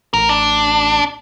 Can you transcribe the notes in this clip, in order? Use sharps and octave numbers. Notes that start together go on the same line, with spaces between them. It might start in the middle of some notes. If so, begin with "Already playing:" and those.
A1 A#4
D4